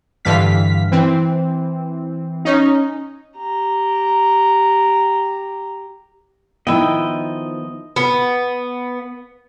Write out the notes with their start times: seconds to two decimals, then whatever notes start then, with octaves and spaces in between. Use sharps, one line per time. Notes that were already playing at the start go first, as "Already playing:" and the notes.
0.25 G2 D3 E3 G3 F5 B6
0.92 E3 C4
2.45 C#4 D#4
3.37 G4 A#5
6.67 D#3 F3 B3 E4 D#5 G5
7.96 B3